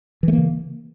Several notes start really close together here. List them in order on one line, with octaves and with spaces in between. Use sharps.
E3 A3 A#3 C#3